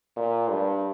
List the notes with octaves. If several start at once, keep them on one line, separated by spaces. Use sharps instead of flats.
A#2
G2